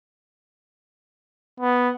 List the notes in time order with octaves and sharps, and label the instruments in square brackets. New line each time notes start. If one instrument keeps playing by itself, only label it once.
[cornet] B3